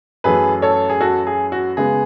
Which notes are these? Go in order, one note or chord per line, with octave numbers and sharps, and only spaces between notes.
F#2 E3 A3 G#4 B4
A4 C#5
G#4
F#4 A4
G#4
F#4
C#3 G#3 B3 G#4